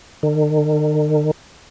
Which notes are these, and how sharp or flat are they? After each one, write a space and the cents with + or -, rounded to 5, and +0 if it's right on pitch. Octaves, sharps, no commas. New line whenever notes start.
D#3 -45